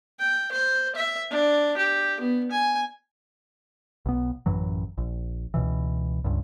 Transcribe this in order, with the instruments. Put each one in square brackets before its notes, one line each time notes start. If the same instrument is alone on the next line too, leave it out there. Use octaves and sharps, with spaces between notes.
[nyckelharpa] G5
C5
E5
D4
G4
B3
G#5
[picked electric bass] B1 B3
A1 F#2 E3 F#3
A#1
C#2 B2 E3
C#2 G2